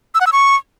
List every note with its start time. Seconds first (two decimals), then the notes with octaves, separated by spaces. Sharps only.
0.15 E6
0.21 F#5
0.27 E6
0.33 C#6